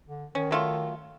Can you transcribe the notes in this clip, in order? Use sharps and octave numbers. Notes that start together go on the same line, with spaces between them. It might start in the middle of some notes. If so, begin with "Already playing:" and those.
D3
D#3 C#4
F#3 A3 F4